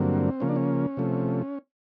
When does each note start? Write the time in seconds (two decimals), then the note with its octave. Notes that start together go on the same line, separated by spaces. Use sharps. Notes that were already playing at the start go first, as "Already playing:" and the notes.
Already playing: G2 D3 F#3 A#3 C4
0.40 C#3 F3 A#3 C#4
0.49 D4
0.56 C#4
0.97 C3 F3 A3